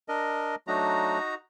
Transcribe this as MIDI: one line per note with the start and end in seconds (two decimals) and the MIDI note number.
0.08 0.55 62
0.08 0.55 70
0.08 0.55 75
0.67 1.19 54
0.67 1.19 57
0.67 1.19 62
0.67 1.35 63
0.67 1.35 66
0.67 1.35 82